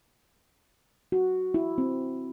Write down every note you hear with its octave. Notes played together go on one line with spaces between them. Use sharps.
F#4
E4
C4